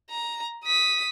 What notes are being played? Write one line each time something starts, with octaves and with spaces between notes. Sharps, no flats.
A#5
D#6 B6